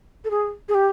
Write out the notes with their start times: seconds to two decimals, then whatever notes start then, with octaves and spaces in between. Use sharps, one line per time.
0.25 A4
0.31 G#4
0.69 G#4
0.75 G4